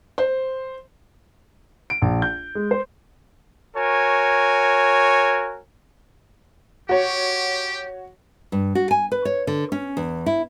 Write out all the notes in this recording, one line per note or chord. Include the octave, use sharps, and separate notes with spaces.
C5
D7
A#1
G6
G#3
C5
F#4 A#4 C#5 G#5
F#4 G4 C#5
G2
F#4
G#5
B4
C#5
D3
C#4
E2
E4